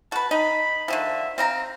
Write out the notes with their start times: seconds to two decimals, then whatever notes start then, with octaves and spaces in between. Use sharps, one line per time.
0.12 F#4 B4 A5
0.31 D#4 B5
0.88 D3 D#3 F3 E5
1.38 C4 D#5 F5 A#5